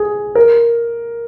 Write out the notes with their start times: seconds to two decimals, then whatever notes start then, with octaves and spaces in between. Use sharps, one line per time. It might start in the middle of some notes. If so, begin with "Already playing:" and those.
Already playing: G#4
0.35 A#4